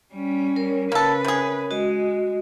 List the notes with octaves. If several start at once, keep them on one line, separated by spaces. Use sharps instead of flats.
G3 C#4
A#4 C#5
C#3 A#3 A4 B4
C3 G#4
G#3 F#4 D#5